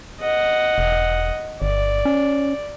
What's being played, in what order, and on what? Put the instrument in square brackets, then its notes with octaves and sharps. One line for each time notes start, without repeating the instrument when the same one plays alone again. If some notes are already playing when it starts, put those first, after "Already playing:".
[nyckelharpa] D#5 F#5
[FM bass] E1
[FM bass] G1 [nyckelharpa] D5
[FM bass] C#4